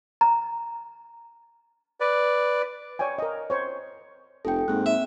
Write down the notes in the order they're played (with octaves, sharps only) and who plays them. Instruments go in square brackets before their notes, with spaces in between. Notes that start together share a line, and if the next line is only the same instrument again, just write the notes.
[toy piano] A#5
[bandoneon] B4 D5
[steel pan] C#5 D5 G5 G#5
A#4 D#5
C5 C#5
[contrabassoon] F1 [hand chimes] A4 G5
[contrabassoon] G#2 [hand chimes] A#3 C4 F#6
[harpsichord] E5